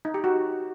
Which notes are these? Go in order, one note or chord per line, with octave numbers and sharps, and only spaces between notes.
D#4
G4
F#4